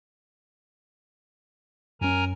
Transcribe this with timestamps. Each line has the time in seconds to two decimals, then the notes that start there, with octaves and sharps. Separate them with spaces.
2.01 F#2 C#4 A#4 G#5 A#5